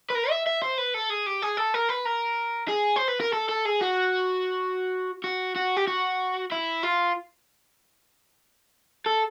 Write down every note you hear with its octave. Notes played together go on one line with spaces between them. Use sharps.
B4
A#4
E5
E5
C5
B4
A4
G#4
G4
G#4
A4
A#4
B4
A#4
G#4
C5
B4
A#4
A4
A4
G#4
F#4
F#4
F#4
G4
F#4
E4
F4
A4